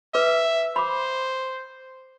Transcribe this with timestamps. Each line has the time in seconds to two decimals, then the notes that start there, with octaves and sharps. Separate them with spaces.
0.14 B4 E5 D6
0.76 C5 B5 D6